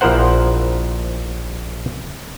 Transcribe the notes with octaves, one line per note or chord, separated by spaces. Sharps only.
A#1 F3 E4 A#4 C5 F#5